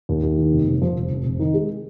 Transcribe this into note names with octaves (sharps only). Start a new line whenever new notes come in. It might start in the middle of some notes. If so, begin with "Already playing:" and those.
D#2
D#2
D#3
F1
F1
F3
F1
F1
F1
D#3
G#3